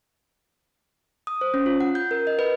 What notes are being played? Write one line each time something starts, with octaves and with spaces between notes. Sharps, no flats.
D#6
C5
C#4
F4
F#5
G6
A#4
D#5
B4